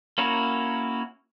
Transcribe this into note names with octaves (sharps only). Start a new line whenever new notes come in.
A#3 C#4 E4 F#4 A#4